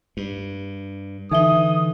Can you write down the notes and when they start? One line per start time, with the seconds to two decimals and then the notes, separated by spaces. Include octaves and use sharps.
0.17 G2
1.31 D3 E3 D#4 E5 D#6 G7